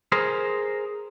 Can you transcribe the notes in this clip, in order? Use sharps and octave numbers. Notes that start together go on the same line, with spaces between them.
G#4 A#4 C5